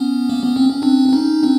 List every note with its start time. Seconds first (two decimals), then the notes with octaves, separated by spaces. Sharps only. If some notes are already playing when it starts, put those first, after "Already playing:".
Already playing: B3 C#4
0.29 A#3
0.43 B3
0.56 C4
0.70 C#4
0.82 C4 D4
1.09 D4
1.13 C#4 D#4
1.43 C4 D4